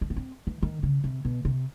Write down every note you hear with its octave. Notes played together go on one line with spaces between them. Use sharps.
D4
B3
C4
E3
D#3
C#3
C3
B2
C3